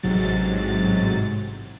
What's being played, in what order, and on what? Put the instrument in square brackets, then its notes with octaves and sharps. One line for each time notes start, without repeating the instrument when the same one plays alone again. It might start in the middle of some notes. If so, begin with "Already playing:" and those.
[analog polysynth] A1 G#2 C3 F#3 A6